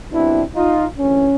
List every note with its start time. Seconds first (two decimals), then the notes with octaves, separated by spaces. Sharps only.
0.12 B2 G3 C4 D4 E4
0.55 D#4 F4
0.98 D2 C3 E3 C#4